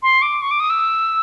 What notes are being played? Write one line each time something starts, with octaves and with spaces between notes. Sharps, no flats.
C6
D6
C#6
D6
D#6
E6